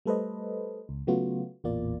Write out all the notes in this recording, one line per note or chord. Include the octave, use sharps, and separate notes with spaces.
G3 A3 A4 B4 C5 D#5
C#2
C#3 F#3 A3 B3 F4 F#4
A1 E2 A#2 A#3 F4 D5